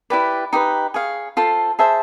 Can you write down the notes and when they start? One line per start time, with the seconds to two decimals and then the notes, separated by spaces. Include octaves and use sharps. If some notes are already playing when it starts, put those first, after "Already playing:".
0.10 E4 G4 B4 D5
0.53 D#4 G4 B4
0.94 G#4 C#5 F5
1.37 F4 A4 C5
1.79 G#4 C5 E5 A5